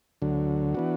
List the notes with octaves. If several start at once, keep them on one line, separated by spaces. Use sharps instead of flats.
D2 D3 F#3
E3 B3 D4 F#4